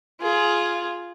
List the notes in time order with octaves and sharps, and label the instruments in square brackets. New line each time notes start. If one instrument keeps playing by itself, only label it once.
[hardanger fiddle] F4 G#4